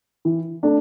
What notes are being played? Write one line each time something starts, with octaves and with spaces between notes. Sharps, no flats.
E3
A3 D4